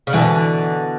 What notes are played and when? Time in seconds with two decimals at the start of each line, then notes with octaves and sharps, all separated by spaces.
0.07 C#3
0.13 B2 D3 E3